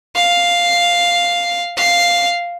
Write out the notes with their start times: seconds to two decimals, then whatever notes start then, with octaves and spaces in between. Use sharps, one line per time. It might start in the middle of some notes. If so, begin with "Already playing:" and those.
0.15 F5
1.77 F5